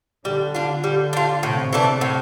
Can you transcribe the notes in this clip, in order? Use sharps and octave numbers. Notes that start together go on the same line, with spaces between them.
D3 G3
D4 F4
G3
D4 F4
A2 C3
E3 A3 D4
A2